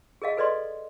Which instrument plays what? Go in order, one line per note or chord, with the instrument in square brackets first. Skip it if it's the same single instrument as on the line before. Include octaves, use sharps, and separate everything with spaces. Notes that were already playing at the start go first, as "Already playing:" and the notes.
[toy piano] G#4 A#4 D#5 F5
A4 B4 D5 D#5 C6